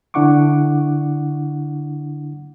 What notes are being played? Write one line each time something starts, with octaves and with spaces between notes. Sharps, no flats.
D3 D4 E4 F#5 C#6 D6